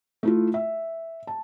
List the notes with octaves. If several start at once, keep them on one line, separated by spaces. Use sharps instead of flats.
A3 E4 F4
E5
A5